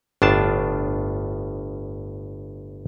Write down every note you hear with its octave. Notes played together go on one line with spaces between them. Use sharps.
G1 A2 D4 F4 A5